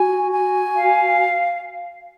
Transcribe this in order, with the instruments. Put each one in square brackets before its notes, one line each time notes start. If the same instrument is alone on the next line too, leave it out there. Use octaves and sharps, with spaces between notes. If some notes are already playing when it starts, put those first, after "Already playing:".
Already playing: [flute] F#4 [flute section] G#5
[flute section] G#5
F5